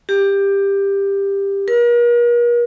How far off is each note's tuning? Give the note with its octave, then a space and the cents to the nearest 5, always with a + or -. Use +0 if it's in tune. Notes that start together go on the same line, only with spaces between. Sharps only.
G4 +15
A#4 +40